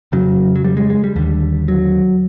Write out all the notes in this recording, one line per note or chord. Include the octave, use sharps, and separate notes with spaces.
F2 C#3 F#3
F#3
G3
G#3
G#3
G3
D#2 D3 G3
F#3